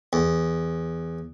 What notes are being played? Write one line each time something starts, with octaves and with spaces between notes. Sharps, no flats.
E2